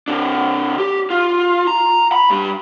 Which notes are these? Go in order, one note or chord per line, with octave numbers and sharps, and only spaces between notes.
C3 D4
G4
F4
A#5
B5
G2 G3